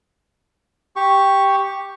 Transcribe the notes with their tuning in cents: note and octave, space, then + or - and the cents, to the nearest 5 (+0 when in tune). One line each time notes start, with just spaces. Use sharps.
G4 +0 C#6 +0